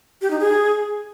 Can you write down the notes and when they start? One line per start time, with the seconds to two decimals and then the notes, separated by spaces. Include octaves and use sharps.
0.22 G4
0.31 D#4
0.40 G#4